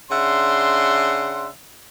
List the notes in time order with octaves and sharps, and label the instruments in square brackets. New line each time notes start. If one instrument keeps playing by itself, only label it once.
[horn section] C#3 D4 E5 F#5 C6